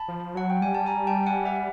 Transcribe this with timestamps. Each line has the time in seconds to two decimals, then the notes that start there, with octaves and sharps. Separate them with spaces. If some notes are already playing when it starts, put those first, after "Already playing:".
Already playing: A5 B5
0.08 F3
0.35 F#3 F#5
0.50 G5
0.61 G3 G#5
0.75 A5
0.86 G#5 A#5
1.07 G5 A5
1.26 F#5 G#5
1.45 E5 F#5